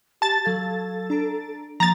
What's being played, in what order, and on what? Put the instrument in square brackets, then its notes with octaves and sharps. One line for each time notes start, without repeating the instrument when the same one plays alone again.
[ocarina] G4 [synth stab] A5 A6
[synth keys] F#3 F5 G#6 [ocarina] A4
[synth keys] D4 A#5 D7
[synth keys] F3 [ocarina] A#3 [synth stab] A#5 A6